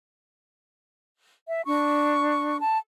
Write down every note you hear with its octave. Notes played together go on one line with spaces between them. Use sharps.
E5
D4 C#6
A5